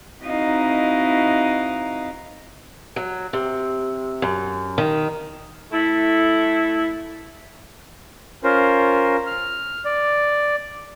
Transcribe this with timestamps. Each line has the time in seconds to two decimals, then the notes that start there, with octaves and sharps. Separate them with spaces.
0.23 C4 D#4 E4 F#4 D#5 F5
2.96 F#3
3.33 C3
4.22 F#2
4.78 D#3
5.72 A3 E4
8.44 C#4 F4 A#4 C5
9.27 F6
9.85 D5